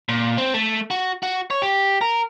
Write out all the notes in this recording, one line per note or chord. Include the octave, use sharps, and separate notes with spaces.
A#2
C4
A3
F#4
F#4
C#5
G4
A#4